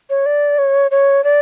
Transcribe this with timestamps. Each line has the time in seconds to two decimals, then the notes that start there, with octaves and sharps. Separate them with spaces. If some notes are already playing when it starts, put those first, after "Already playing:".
0.10 C#5
0.26 D5
0.58 C#5
0.91 C#5
1.24 D5